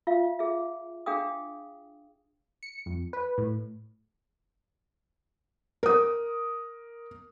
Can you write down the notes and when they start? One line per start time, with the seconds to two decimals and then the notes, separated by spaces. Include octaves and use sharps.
0.07 F4 E5 F5
0.39 G#4 E5
1.06 D4 G#4 F5 G5 D#6
2.63 C#7
2.86 F2
3.13 B4
3.38 A2
5.83 A#4 D#6